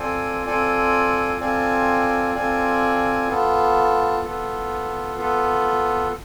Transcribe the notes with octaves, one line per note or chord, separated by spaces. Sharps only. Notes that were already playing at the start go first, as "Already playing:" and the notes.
Already playing: C4 F4 A4 D5 G#5
C4 F4 A4 D5 G#5
C4 F4 A4 D5 G#5
C4 F4 A4 D5 G#5
B3 F4 A4
B3 F4 A4
B3 F4 A4